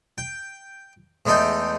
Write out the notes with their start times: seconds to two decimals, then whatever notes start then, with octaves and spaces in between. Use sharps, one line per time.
0.18 G5
1.26 E2 G#3 A3 D#4 G5